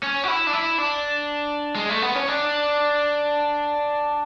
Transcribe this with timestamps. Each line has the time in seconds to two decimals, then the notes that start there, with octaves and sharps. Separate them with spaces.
0.03 C#4
0.24 F#4
0.28 E4
0.47 D4
0.53 E4
0.78 D4
1.76 G#3
1.89 A3
2.02 B3
2.15 C#4
2.28 D4